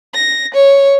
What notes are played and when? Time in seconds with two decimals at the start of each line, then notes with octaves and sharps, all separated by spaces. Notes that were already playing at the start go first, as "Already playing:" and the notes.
0.14 A#6
0.54 C#5